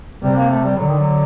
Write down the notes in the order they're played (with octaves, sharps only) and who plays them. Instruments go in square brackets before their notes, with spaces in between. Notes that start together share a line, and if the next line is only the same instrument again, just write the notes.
[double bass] C3 [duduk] G3
[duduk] A#3
A3
G3
[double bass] D3 [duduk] F#3
[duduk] D#3
F#3